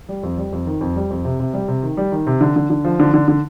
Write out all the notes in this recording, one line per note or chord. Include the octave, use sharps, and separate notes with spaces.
G3
F2
G3
F2
D#3
F2
G3
F2
C3
C3
G3
C3
D#3
G3
D#3
C3
D3
D3
D3
F3
D3
D3
D3